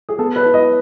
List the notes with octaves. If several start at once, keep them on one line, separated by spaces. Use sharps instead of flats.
G#4
B3 A4
B4
E4
D#5